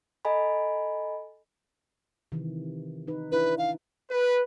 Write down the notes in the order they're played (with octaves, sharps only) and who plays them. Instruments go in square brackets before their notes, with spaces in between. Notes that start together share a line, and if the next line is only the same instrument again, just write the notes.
[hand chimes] A4 D#5 G#5 A#5 B5
[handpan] C3 D#3 E3
D#4 B4
[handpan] D4 E4 [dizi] B4
[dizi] F5
[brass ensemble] B4